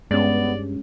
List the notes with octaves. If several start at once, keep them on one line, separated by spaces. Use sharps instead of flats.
G2 G#3 B3 C#4 D5